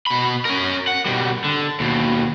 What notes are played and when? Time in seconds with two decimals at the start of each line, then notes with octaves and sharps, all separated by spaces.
0.07 B2 B5
0.45 C#4 A#4
0.87 F#5
1.06 B2 G3
1.44 D3
1.80 D#2 B2